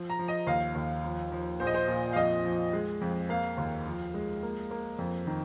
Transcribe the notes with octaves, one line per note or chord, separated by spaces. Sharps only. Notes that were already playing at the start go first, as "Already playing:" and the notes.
Already playing: F3
A#5
F3
D#5
D#2 F5
D#2
F3
F3
A#1 C5
D#5
C5
A#2
F5
F2 D#5
F3
G#3
F2
A#3 F5
D#2
F3
G#3
A#3
A#3
F2
D#3